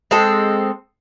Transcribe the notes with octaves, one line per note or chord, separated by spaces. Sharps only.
G#3 C4 A4